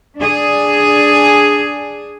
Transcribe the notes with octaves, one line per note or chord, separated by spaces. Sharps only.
D4 G#4